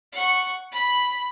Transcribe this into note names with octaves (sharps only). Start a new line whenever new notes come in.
F#5 C#6
B5